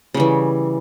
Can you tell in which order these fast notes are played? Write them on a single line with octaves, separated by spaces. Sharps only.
C#3 G3 E3